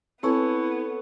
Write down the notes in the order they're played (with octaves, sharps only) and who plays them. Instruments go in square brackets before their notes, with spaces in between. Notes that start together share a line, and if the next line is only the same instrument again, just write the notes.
[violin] B3 [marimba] C4 B4 G#5 [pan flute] E4 [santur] A4 C#5